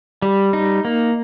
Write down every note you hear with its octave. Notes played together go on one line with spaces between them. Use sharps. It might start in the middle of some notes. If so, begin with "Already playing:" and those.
G3
D#4
A#3